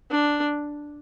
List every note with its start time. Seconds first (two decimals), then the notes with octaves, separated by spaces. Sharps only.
0.11 D4